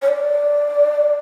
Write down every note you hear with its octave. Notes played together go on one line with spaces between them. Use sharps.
C#5
D5